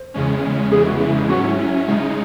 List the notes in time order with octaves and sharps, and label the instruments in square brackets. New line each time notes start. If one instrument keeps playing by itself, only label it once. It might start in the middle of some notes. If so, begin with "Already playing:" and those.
Already playing: [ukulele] C5
[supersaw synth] E2 C#3 G#3 C#4
[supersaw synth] E2 C#3 E3 G#3 [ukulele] G#4
[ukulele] F#4
E4
D#4
[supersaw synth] G#2 F#3 C#4 [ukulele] F#4
[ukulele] E4
E4
[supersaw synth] C#3 G#3 D#4